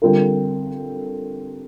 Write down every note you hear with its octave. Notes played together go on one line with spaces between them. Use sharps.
D3 G3 C4 F4 A#4